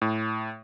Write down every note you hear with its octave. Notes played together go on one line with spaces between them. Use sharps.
A2